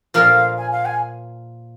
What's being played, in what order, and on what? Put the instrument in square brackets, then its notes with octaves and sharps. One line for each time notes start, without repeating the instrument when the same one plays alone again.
[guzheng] A#2 F3 A#3 F4 A#4 [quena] F5
[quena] G#5
F5
G#5